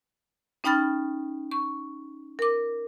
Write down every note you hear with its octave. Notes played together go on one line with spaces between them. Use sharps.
C#4 D#4 G5 B5 F6 A6
C#6
A#4 D6